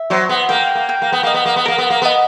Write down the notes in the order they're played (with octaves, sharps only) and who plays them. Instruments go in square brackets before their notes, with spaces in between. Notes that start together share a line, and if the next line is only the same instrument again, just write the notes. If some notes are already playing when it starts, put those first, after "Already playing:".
Already playing: [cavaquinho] E5
[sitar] F#3 [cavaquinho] C5
[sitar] B3
[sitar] A#3 [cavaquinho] G5
[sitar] A#3
[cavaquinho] G5
[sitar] A#3
B3
[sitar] A#3 [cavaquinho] D#5
[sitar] B3
A#3
B3
[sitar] A#3 [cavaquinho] A#4
[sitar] B3
A#3
[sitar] B3 [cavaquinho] D#5